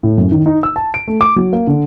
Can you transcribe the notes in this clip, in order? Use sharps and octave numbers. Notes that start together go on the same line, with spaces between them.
A2
F#2
D#3
D#4
E6
A5
D7
A3
D6
F#3
A#3
D3